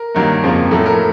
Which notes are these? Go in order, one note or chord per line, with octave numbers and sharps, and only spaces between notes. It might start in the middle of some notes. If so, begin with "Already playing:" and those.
Already playing: A#4
G2 D#3 F#3 A#3
F2 C#3 F3 A#3
A2 F#3 A3 A4
A#4